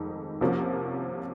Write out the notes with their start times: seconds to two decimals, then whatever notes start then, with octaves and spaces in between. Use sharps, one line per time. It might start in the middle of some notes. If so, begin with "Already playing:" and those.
Already playing: F1 F2 D#3 G#3 D#4
0.41 C2 C3 F3 A#3 C#4